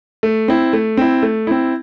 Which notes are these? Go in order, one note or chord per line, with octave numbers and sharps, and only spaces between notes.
A3
C4 E4
A3
C4 E4
A3
C4 E4